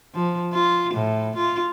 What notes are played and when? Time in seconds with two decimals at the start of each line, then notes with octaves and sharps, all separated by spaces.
0.14 F3
0.53 F4
0.94 A2
1.37 F4